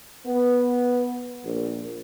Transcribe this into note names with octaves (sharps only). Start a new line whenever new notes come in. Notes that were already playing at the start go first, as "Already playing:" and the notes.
B3
A#1